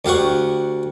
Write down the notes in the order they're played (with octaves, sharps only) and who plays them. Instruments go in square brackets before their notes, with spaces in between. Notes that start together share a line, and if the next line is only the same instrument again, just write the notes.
[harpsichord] D2 G4 F5 F#5 C#6